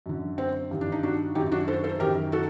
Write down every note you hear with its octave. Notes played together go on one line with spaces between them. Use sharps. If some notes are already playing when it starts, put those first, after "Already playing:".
F#2 D3
C4
G2 D#3
D4
D#4
D4 F#4
F#2 D#3 D#4 G4
D4 F#4
A4 C5
A4 C5
F#2 D#3 G4 A#4
F#4 A4